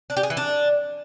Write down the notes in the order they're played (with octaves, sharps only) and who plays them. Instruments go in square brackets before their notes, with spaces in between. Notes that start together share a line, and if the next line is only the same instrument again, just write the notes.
[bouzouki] D4
G4
G#4
E3
D4